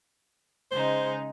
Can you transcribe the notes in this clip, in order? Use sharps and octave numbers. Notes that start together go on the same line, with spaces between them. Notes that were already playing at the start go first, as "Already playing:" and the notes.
C#3 G#3 D#4 C5